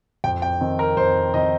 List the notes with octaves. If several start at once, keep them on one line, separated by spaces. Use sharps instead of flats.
F2 G5
G5
D#3 C4 D#4
A#4
F2 C5
D#3 C4 D#4 D#5